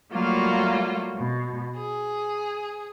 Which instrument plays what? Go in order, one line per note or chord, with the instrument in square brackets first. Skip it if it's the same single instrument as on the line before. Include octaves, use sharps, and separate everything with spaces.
[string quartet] F#3 G3 A3 A#3 F4 F#4
B2
G#4